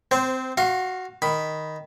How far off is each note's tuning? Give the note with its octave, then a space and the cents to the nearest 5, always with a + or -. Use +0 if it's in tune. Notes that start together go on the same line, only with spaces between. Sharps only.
C4 -15 C5 +0
F#4 +0 F5 +0 C6 +40
D#3 +0 B5 +0